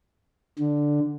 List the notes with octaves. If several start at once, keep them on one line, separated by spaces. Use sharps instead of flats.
D3